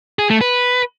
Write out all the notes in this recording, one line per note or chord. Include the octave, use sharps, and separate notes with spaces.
G#4
A3
B4